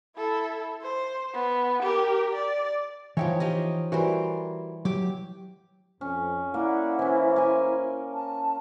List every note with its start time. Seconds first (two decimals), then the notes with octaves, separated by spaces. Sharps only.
0.16 E4 A4
0.82 C5
1.34 B3
1.83 G4 A#4
2.35 D5
3.17 E3 F3 D#4 C#5 E5 G5
3.40 F3 G4 D#5
3.92 E3 G3 F#4 A#4 C5
4.85 F#3 G4 D6
6.01 F2 C#4
6.54 A#3 E4 D5 F5 F#5
6.99 E3 C#4 C5
7.36 A#3 G#5
8.14 A5